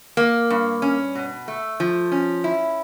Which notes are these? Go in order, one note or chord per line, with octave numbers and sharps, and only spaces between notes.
A#3
G2
C#4
B2
A3
F3
C#4
E4